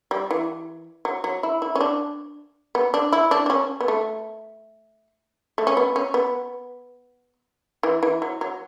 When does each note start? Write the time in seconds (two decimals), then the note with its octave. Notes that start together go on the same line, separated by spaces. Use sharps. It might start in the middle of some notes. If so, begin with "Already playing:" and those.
0.11 G3
0.31 E3
1.05 F#3
1.24 F#3
1.43 E4
1.62 E4
1.75 C#4
1.81 D4
2.75 B3
2.94 D4
3.12 E4
3.31 D4
3.46 D4
3.50 C#4
3.80 B3
3.88 A3
5.58 A3
5.67 C#4
5.77 B3
5.96 C#4
6.14 B3
7.83 E3
8.03 E3
8.22 F#3
8.41 F#3